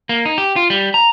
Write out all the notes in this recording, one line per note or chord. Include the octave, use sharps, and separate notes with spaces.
A#3
D#4
G4
F4
G3
A#5